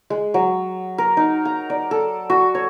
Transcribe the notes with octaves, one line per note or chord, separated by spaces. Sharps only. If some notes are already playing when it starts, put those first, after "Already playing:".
G#3
F#3
A#4
D#4
A#5
D5
A4
F#4
C#5